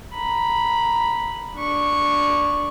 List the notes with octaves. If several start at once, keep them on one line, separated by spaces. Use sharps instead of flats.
A#5 B5
D4 C#6